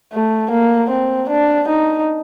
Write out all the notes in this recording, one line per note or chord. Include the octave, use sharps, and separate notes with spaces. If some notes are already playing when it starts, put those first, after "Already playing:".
A3
A#3
C4
D4
D#4